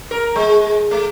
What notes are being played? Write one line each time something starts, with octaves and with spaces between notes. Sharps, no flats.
A#4
G#3
A3